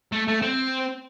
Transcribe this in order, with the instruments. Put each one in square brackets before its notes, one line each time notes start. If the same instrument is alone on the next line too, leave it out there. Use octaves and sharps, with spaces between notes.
[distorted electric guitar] A3
A3
C4